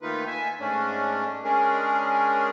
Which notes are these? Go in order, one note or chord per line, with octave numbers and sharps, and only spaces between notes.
D#3 A3 A#3 D#4 F4 B4
E5 G#5
G#2 A3 C#4 D4
G#3 C#4 D4 G#4 A#4